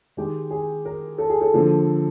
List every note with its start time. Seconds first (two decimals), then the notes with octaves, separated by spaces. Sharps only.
0.17 D#3 G#3 G4
0.51 G#4
0.85 A#4
1.18 A4
1.30 G#4
1.41 A4
1.53 D3 F3 A#3